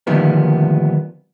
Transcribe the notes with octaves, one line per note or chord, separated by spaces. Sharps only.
D2 A#2 D#3 F3 G3 B3